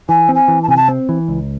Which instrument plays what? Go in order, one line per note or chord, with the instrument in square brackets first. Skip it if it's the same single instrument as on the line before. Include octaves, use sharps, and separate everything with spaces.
[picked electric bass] E3 [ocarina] G#5
[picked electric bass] C4
[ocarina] G#5
[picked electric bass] E3
[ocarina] A5
[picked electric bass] C3 [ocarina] G#5
[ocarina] A5
[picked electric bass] C4
E3
C#2